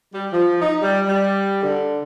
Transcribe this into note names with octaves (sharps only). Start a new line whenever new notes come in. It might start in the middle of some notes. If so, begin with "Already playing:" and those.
G3
F3
D#4
G3
G3
D3